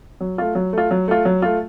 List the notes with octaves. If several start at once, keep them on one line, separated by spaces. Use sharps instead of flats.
F#3
A3 F4
F#3
A3 F4
F#3
A3 F4
F#3
A3 F4